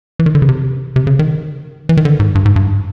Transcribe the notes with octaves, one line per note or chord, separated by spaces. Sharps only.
E3
D#3
D3
C#3
C3
C3
C#3
D#3
E3
D#3
D3
G#2
G2
G#2
G2